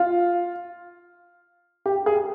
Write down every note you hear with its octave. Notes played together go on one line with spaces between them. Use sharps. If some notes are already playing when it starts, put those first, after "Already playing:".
Already playing: F4
G4
G#4